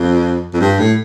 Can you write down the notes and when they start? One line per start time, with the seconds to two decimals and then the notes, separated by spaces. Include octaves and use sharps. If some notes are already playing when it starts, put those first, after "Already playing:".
Already playing: F2
0.54 F2
0.60 G2
0.79 A2